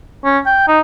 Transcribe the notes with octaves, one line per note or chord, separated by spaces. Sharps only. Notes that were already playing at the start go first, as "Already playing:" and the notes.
C#4
G5
D#4